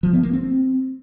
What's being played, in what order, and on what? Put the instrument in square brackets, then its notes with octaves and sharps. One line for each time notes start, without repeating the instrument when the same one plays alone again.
[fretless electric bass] F3
B3
A#3
C4